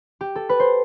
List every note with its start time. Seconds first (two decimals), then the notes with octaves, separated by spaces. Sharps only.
0.21 G4
0.35 A4
0.49 B4
0.60 C5